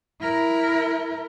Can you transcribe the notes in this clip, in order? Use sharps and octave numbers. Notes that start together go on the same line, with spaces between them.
E4 A#4